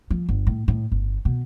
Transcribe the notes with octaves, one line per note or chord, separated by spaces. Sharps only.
F3
G1
A2
A2
G1
B2